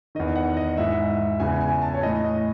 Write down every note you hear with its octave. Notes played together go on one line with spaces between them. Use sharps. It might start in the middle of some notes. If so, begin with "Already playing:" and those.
E2 D#3 D#5
F#5
D#5
G#2 E3 E5
E2 C#3 E3 G#5
G#5
A5
C#5
A2 E3 D#5
D#5